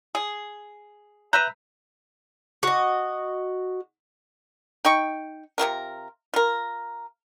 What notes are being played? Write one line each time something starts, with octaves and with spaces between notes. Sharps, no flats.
G#4
B4 E5 A#5 F#6 G6
F#4 D#5
D#4 G5 C#6
C3 F#3 F4 A#4
F4 A#4